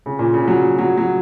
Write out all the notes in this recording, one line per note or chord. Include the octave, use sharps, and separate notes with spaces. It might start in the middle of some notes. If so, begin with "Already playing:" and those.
C#3
A#2
C#3
F#3
F#3
F#3